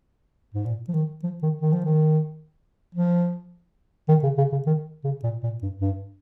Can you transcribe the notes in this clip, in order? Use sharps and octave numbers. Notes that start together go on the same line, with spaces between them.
G#2
A#2
F3
D#3
F3
D#3
D#3
F3
D#3
F3
D#3
C#3
C#3
C#3
D#3
C#3
A#2
A#2
G2
G2